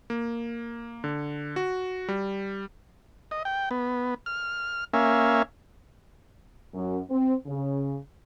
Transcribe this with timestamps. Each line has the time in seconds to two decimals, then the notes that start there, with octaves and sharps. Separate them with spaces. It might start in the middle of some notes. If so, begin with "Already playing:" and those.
0.10 A#3
1.04 D3
1.56 F#4
2.09 G3
3.31 D#5
3.45 G5
3.71 B3
4.26 F6
4.94 A#3 C#4 E5 F5 G#5
6.74 F#2
7.10 C4
7.47 C#3